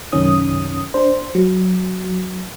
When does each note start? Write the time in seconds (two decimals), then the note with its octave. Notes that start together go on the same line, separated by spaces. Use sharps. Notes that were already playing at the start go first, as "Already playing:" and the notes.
0.12 B1 F#2 C3 D#3 C#4 D#6
0.94 D4 C5
1.35 F#3